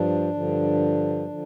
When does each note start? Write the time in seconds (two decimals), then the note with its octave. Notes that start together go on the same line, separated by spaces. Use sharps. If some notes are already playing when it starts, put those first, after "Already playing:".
Already playing: G2 F3 D4
0.34 G2 D3 F3
1.28 D3 F3